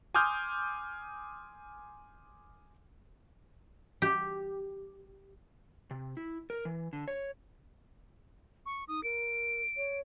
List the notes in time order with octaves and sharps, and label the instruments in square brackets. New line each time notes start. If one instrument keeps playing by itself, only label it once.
[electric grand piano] G#5 C6 D6 D#6 F6 G6
[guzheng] G4
[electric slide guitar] C3
E4
A#4
E3
D3
C#5
[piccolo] C#6
[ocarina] D#4 [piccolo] D#6
[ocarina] A#4 [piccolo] D7
[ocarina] C#5